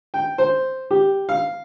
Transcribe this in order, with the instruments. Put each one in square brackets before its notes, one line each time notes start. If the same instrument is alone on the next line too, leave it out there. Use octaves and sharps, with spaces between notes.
[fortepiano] G5
C5
G4
F5